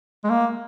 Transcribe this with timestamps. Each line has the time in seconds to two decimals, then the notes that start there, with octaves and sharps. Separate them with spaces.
0.24 G#3
0.30 A#3